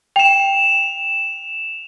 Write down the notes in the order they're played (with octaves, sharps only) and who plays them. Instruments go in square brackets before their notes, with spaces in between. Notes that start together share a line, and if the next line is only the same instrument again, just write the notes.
[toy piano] G5 [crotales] E7 F7